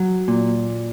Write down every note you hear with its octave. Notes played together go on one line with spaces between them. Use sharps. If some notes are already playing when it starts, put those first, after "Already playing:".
Already playing: F#3
A#2